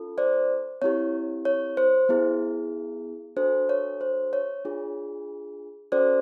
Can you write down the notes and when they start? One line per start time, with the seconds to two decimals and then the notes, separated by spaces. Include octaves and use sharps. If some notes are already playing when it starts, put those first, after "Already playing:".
Already playing: C#4 F4 A4
0.18 C5 D5
0.82 C4 E4 G4 C#5
1.45 C#5
1.77 C5
2.09 B3 E4 G#4
3.37 D4 F#4 A4 C5
3.69 C#5
4.01 C5
4.33 C#5
4.65 D4 F4 G#4
5.92 C#4 F#4 A4 C5 D5